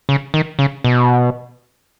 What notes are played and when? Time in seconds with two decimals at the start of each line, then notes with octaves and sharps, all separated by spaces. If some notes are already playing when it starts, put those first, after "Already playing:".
0.09 C#3
0.34 D#3
0.59 C#3
0.84 B2